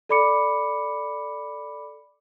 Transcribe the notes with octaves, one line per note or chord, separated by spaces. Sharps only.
A4 D5 B5 D6 C#7